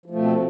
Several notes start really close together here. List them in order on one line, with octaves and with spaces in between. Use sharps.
F3 A3 B2 C4